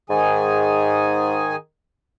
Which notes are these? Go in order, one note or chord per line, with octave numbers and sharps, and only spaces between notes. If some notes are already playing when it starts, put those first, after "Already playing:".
G#2 D#3 G#4 G#5